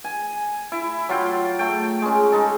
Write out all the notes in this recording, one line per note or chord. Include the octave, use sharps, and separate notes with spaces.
G#5
E4
F#3 F4 G5
A3 G5
G#3 C#4
G#3 D#4 A4